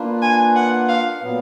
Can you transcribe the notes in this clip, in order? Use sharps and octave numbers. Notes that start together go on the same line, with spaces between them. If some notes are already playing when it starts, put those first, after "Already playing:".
Already playing: A#3 D4 F4 B4
G#5
F#5
F5
A#2 F#3 B3